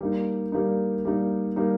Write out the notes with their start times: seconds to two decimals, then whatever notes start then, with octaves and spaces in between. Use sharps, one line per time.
0.01 G3 A#3 D#4
0.52 G3 A#3 D#4
1.05 G3 A#3 D#4
1.56 G3 A#3 D#4